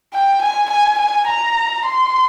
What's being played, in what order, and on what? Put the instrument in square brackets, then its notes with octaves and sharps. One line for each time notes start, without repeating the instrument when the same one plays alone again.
[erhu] G5
G#5
G#5
G#5
A#5
C6